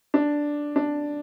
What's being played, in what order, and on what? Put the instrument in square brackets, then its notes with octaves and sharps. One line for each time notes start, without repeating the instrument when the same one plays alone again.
[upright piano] D4
D4